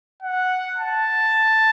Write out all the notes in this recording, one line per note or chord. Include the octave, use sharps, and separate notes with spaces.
F#5
A5